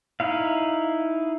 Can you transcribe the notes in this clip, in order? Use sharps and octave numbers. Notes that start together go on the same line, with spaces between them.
D#4 E4 F5